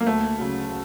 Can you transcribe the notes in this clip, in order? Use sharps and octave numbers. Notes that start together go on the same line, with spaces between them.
A#3
D2 A3
C#3 F#3